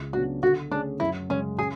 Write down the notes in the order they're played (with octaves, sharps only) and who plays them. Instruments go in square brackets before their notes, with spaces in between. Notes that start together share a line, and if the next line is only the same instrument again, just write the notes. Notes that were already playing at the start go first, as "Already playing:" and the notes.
Already playing: [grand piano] C#2
[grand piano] C#3 F#3 B3 D4 [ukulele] F#4
[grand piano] D3 [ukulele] F#4
[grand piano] A3 C#4 G#4 [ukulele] D4
[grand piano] F#2 [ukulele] E4
[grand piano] C#3 G#3 [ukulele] C#4
[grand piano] C#3 [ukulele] G#4